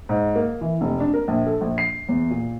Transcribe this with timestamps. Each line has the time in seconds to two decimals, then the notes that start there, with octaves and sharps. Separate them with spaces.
0.09 G#2
0.36 A#3
0.61 E3
0.81 F1
1.00 D4
1.14 A#4
1.28 A#1
1.46 A4
1.61 A#1
1.78 C7
2.09 E2
2.30 A#2